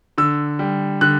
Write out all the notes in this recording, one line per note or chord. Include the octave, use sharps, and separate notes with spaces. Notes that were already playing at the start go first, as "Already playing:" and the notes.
D3 E6
G3
D3 F#6